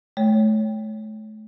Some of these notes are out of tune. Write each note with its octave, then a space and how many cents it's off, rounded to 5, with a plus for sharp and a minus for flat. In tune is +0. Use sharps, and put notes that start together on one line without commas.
A3 -35 C#5 +5